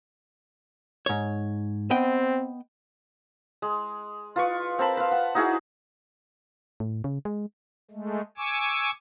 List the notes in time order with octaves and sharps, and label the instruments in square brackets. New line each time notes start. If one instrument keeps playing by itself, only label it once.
[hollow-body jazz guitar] G#2 C#5
[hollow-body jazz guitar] B3 D#5 G5 [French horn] C4
[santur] G#3
F4 B4 C#6
C4 A#4 A5 B5
B4 F5
F#5
D#4 E4 F#4 G#4
[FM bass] A2
C#3
G#3
[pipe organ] G#3 A3
G#5 C#6 D6 E6